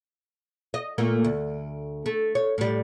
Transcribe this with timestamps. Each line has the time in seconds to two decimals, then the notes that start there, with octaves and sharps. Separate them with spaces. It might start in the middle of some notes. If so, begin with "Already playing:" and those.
0.74 D#5
0.98 A#2 A3 A#3
1.24 D2
2.06 A3
2.35 C#5
2.58 A2 G3